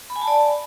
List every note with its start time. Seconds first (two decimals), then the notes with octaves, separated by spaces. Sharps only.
0.10 B5
0.16 G#5
0.22 A5
0.27 D5